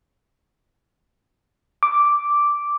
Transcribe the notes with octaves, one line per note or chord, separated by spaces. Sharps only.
D6